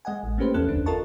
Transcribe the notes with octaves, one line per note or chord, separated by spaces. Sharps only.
G#3 D#5 F#5 G#5
A1
A3 A#3 C#4 G4 B4 C5
E2 F3 C#4 A4 F#6
G1 D2 D4
F4 A4 A#4 D#5 A5 C#6